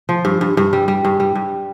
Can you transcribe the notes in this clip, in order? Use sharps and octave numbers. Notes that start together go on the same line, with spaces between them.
F3
G2
G2
G2
G3
G3
G2
G3
G2